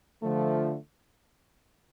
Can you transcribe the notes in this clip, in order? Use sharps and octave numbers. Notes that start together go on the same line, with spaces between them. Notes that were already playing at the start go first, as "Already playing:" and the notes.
D3 F3 A3